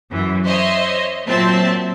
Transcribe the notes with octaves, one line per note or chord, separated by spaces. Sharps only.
F#2 E3
C5 C#5 D#5 E5
A#2 F#3 C4 C5 E5 A5